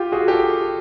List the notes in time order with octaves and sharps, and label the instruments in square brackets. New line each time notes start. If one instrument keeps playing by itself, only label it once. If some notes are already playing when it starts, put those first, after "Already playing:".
Already playing: [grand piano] F4 G4
F#4 G#4
G4 A4